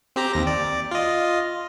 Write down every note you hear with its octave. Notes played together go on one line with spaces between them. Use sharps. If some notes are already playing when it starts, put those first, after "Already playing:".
C4 G4 A#5
D#2 A#6
D5
F4 D#5